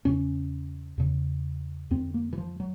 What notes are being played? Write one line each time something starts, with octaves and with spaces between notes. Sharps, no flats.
E2 C#3 C#4
E2 C#3
F2 D3 C4
A#3
E3
F3
F#3